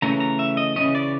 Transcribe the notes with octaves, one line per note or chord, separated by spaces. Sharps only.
C#3 E3 A3 C#4 A#5
A#5
E5
D#5
C#3 E3 A3 C#4 D#5
D5